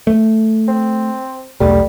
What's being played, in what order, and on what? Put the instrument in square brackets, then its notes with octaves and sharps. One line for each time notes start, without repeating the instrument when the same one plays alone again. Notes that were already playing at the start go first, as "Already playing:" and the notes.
[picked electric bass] A3
[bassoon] C4
[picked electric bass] B1 E2 A3 [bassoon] G3